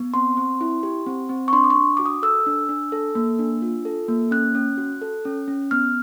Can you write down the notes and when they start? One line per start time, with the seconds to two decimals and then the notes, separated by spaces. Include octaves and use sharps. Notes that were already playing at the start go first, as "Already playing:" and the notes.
Already playing: B3
0.14 C4 C6
0.37 C4
0.61 E4
0.83 G4
1.06 C4
1.29 C4
1.48 C#6
1.53 D4 C6
1.64 D6
1.70 C#6
1.76 D4
1.97 F#4 D6
2.06 D#6
2.23 A4 E6
2.46 D4
2.69 D4
2.92 A4
3.15 A#3
3.39 D4
3.62 F4
3.85 A4
4.08 A#3
4.31 C#4 F#6
4.55 C#4
4.78 F#4
5.02 A4
5.25 C#4
5.48 C#4
5.71 B3 F6